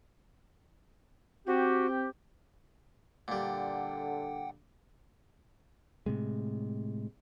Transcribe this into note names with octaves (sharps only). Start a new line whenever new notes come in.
C4 F#4 G4
A#2 D3 G3 F#5 G5
A2 C3 G#3